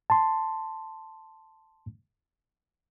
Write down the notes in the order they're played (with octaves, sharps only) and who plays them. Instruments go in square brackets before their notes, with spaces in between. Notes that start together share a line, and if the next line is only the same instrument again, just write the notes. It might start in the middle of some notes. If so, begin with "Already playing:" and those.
[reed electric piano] A5 C6